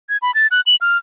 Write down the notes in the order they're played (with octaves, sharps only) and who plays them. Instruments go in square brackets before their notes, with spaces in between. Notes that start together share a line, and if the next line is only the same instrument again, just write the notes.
[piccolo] G#6
B5
A6
F#6
F#7
F6